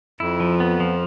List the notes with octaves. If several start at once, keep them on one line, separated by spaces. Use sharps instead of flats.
F2 E4
F3
B3
F3